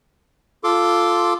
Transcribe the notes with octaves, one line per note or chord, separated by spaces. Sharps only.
F4 A4 C6 D6